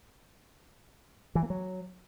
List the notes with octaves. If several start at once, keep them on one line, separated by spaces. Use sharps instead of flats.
E3
A#3
F#3